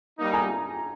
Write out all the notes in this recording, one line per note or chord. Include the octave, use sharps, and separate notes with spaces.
G3 A#3 D#4
G#5 A#5